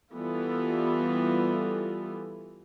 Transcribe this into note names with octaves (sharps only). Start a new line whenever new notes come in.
E3 G3 B3 F4 A4